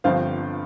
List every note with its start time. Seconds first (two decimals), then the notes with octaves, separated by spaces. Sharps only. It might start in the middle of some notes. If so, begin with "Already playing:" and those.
0.04 G1 G2 F3 C4 C5 F5